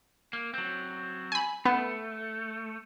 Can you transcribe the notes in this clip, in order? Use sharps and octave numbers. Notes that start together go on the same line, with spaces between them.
A#3
F#3 C4
G#5 B5
A3 B3